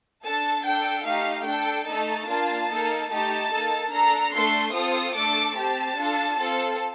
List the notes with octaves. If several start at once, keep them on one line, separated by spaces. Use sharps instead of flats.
D4 A4 A5
D4 A4 G5
A3 D#4 G4 F5
D4 A4 G5
A3 D#4 A4 A5
A#3 D4 F4
A#3 D#4 A4
A3 D#4 G4 A5
A#3 D#4 A4
D4 A4 A#5
A3 D4 A4 C6
C4 F4 A4 D#6
A3 D4 A4 D6
C4 G4 A5
D4 F4 A4
C4 F4 A4